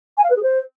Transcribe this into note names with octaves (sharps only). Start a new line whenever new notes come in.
G#5
F5
B4
G#4
C5